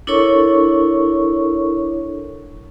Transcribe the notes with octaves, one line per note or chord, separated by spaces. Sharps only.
D4 E4 A4 A#4 C#5 C#6